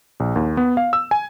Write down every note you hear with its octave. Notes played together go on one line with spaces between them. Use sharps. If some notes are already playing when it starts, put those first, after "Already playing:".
A#1
D#2
B3
F5
E6
G#5